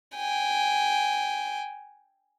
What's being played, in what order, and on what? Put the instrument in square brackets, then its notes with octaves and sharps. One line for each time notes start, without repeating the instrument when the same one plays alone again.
[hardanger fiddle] G5 G#5